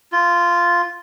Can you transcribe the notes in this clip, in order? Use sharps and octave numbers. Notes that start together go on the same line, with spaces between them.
F4